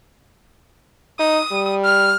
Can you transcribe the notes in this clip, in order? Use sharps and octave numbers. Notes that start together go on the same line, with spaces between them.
D#4 D#6
G3
F6